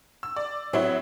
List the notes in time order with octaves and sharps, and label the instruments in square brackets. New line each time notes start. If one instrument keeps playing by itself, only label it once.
[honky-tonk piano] E6
D5
[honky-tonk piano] A2 C4 E4 [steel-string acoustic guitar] F#3